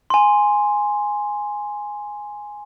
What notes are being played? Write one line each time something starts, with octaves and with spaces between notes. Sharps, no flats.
G#5 C6